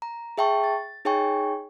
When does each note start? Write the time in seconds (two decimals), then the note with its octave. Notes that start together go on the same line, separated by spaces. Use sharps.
0.02 A#5
0.38 G#4 E5 G5 A5 C#6
0.64 A6
1.05 D#4 G#4 C#5 G5 G#5 C#6